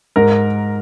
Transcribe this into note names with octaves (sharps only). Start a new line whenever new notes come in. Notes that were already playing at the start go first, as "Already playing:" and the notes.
G#2 A#4